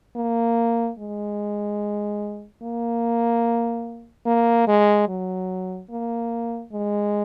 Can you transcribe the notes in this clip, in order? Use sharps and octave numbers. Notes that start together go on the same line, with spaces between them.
A#3
G#3
A#3
A#3
G#3
F#3
A#3
G#3